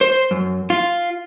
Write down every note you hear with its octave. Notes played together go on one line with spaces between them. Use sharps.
C5
F#2
F4